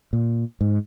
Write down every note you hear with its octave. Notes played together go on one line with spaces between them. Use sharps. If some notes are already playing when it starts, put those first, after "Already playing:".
A#2
G#2